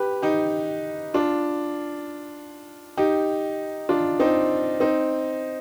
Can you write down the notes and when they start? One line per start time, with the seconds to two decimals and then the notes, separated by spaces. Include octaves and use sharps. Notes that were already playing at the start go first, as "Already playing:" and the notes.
Already playing: G4 B4
0.22 D#4 G4
1.14 D4 F4
2.97 D#4 G4
3.89 D4 F4
4.20 C4 D#4
4.80 C4 D#4